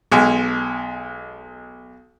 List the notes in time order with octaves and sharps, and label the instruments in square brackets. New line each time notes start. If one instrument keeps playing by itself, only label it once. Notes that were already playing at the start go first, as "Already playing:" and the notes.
[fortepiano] B1 G#3